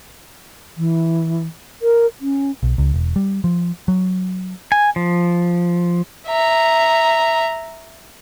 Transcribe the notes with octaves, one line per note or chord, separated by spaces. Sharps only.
E3
A#4
C#4
B1
C#2
E1
G3
F3
F#3
G#5
F3
E5 A#5